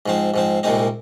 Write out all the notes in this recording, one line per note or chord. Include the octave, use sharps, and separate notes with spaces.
G#2 F3 C4
G#2 F3 C4
C2 A#2 G#3 C4 D#4